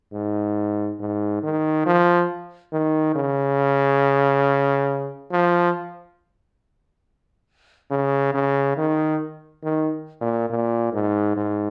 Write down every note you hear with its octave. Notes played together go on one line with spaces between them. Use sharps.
G#2
G#2
D#3
F3
D#3
C#3
F3
C#3
C#3
D#3
D#3
A#2
A#2
G#2
G#2